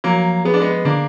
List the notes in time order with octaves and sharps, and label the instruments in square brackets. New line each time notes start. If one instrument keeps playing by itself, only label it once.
[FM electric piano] F3 [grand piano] F#3 A#3
[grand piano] B3 [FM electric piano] G#4
[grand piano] D4
G#3 B3
[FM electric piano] D3 [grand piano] A#3 D4